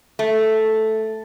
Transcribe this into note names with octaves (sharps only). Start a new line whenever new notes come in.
A3